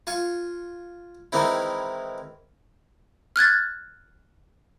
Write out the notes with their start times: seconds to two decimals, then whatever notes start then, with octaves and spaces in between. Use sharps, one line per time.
0.07 F4 G#5 C#6
1.32 D#3 E3 G#3 C4 E4
3.36 F6 F#6 G#6 A6